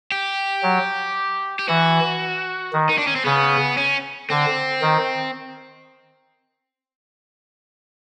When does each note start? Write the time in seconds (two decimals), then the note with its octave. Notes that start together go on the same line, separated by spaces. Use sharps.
0.12 G4
0.63 F#3
1.59 G4
1.69 E3 F#4
2.73 D#3
2.89 D#4
2.98 D4
3.07 C#4
3.16 C4
3.25 C#3 B3
3.77 C#4
4.30 D3 C4
4.82 D#3